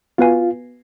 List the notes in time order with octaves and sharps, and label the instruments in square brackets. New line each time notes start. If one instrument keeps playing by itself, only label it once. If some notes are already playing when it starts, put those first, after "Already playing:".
[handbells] B3 F#4 B4 F5 G#5 [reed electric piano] F4